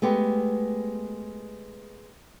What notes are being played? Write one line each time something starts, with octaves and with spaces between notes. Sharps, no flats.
G#3 A3 B3 G4